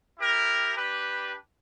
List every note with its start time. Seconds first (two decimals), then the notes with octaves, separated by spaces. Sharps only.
0.18 E4 G4 A#4
0.76 D4 G4 B4